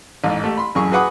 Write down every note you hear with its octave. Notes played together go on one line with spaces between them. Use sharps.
A1 G#2
A3 G4
B5 C6
A1 F#2 G#4 C#6
F#4 G#4 B4 F#5 D6 D#6